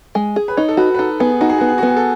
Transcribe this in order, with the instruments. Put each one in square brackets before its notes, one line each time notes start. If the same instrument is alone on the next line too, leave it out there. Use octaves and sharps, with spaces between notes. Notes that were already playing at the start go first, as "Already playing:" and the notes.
[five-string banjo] G#3
G#4
[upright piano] B4
[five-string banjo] D#4 [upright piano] C#5
[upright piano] A4
[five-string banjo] F#4 [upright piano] B4
[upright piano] B4
[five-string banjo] D#4 [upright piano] A4
[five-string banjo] B3 [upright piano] G#4
[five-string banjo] D#4 [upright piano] F#4
[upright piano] G#4
F#4
[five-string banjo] B3
[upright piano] G#4
F#4
[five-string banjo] B3 [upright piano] G#4
[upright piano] A4